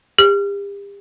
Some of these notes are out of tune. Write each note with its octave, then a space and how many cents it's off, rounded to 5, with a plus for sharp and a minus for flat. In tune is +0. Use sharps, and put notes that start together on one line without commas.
G4 +40